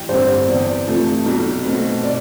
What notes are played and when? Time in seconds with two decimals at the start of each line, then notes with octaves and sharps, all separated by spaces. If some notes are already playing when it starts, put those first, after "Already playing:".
Already playing: A1 G5
0.09 G2 D3 G3 C4 C5
0.48 E2 D5
0.88 C3 F3 A3
1.26 B1
1.65 B2 A3 C4
2.04 D5